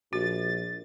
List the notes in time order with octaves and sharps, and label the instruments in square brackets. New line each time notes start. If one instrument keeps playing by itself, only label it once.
[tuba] A#1 [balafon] F#4 [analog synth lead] A6